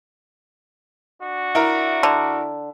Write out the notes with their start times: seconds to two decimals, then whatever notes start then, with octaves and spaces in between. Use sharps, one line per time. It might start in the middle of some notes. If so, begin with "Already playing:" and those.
1.21 D4 F#4
1.55 E4 A#4 A#5
2.03 D3